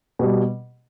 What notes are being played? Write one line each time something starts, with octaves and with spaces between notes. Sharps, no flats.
B2 G3